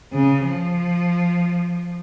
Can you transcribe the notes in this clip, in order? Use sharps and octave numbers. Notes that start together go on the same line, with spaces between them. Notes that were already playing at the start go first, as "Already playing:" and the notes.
C#3
F3